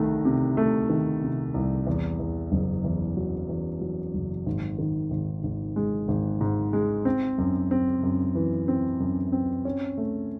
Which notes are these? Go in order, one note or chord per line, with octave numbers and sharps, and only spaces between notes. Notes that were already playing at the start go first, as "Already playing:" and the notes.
Already playing: C2 D#3 A3
C3
A3
D#3
C3
C2
E2
E2
F#1
E2
F#3
E2
F#3
F#1
G#1
D#3
G#1
G#1
G#3
G#1
G#2
G#3
C4
F#2
C4
F#2
E3
C4
F#2
C4
C#4
A3